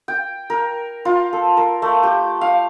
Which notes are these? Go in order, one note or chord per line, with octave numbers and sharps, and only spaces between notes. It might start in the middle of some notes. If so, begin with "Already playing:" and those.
G5
A#4
F4
A4
A#4
A3
G4
F5